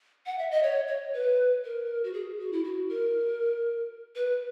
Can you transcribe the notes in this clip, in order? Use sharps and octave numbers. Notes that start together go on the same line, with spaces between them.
F#5
E5
D#5
C#5
C#5
B4
A#4
F#4
G#4
F#4
E4
F#4
A#4
B4